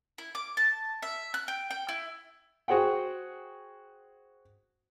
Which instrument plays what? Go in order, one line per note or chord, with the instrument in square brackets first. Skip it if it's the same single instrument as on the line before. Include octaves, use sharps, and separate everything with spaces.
[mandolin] E4
D6
A5
E5
F#6
G5
G5
E4
[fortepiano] F#4 G#4 C5 F#5 G5